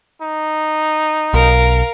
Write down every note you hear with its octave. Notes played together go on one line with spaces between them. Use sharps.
D#4
B1 A#4 F5